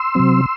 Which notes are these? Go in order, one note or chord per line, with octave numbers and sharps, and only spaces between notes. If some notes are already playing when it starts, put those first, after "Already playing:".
Already playing: C6 E6
C3 F#3 C4